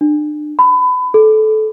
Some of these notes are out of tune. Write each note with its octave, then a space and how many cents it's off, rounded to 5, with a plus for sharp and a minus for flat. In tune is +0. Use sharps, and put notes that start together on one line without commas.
D4 +35
B5 +25
A4 -20